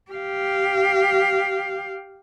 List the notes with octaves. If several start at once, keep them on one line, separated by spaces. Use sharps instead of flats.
G4 F5